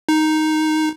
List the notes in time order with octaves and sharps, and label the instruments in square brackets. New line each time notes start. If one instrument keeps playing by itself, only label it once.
[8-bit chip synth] D#4